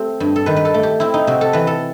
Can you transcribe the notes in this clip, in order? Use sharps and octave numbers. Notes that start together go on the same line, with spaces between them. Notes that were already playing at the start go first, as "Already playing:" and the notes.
Already playing: A3 C4 G4 A4
G2
A4
D#3 B4
B4
A4
A3
G4
C4 E4
D#4
C3 F#4
A4
E3 B4
A4